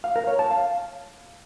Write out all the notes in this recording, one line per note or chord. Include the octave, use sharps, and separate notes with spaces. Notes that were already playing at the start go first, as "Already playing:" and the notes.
F5
A#4
C#5
A5
F5